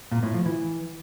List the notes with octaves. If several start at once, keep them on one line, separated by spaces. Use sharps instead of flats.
A#2
A2
F3
E3